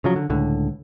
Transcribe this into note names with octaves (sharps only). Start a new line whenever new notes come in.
C#3 F3 F#3
D3
C#2 A2 D3